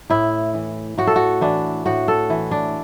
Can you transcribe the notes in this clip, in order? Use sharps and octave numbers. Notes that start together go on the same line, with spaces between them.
A2 E4
E3
A2 F#4
A4
F#4
E3 D4
A2 F#4
A4
E3
D4